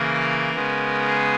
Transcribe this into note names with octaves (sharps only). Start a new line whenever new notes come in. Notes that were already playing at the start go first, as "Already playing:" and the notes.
Already playing: C#3 E3 A#3 A#4
C#3 G#3 B3
G#4